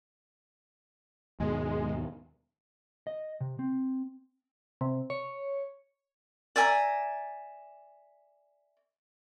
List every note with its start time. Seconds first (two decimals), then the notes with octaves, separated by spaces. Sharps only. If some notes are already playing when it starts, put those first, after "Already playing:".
1.40 D#2 G#2 B2 G#3
3.07 D#5
3.41 C3
3.59 C4
4.81 C3
5.10 C#5
6.56 D5 E5 G#5 A#5